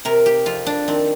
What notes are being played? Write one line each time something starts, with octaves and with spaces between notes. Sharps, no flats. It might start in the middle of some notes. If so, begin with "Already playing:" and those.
C3 A#4
G4
F2 F4
D4
D#3 C4